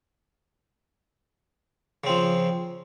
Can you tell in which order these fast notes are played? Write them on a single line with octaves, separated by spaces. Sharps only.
C#3 C4 F3